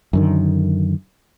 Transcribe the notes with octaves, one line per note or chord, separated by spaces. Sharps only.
F#2 D3 D#3